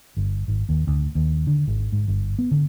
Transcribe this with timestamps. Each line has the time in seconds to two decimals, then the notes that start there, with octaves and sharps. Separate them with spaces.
0.17 G1
0.48 G#1
0.69 D#2
0.87 D2
1.15 D#2
1.47 D3
1.67 G#1
1.92 G#2
2.08 G1
2.39 B3
2.51 D3